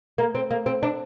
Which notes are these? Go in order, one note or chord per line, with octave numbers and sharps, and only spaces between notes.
A#3
C4
A#3
C4
D4